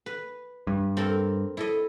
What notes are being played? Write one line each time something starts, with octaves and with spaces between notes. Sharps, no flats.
B4
G2
C4 A4 A#4
E4 A4 D#5